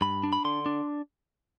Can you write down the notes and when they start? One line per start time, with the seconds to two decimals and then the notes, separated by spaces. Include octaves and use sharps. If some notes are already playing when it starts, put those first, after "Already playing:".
0.01 G2 B5
0.24 D4
0.33 B5
0.45 D3 C6
0.66 D4